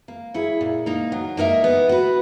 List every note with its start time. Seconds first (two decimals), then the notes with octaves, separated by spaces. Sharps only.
0.08 A#3
0.34 E4 G#4 C#5
0.61 A#2
0.86 A#3 D#4
1.12 F#3
1.37 A#3 D#4 A#4 E5
1.64 B3
1.89 F#4 B4